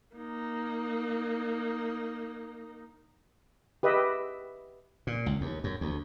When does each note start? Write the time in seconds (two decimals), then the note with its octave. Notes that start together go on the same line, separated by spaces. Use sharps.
0.16 A#3 D#4
3.83 G4 B4 D#5 E5
5.07 A#2
5.26 C#2
5.41 D#2
5.64 F#2
5.81 D2